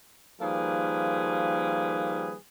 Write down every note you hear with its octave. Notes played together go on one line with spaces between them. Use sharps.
D#3 F3 G3 A#3 G#4 B4